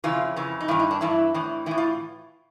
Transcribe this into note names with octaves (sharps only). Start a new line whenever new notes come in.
F2 C#3 E3 F4
F2 C#3 E3
D#4
G2 E3 E4
D#4
D4
G2 E3 E4
A2 E3
A2 E3 E4
F4